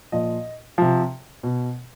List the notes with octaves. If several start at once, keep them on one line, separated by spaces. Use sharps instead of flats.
A#2 F3 D#5
C3 F3
B2